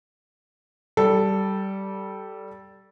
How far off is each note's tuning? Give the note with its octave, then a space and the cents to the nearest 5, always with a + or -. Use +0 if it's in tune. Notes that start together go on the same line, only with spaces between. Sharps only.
G3 -15 A4 +0